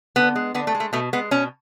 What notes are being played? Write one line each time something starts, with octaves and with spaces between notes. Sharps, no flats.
D3 B3
G#3
D3 B3
A3
G#3
A3
B2 A3
G#3 B3
B2 C#4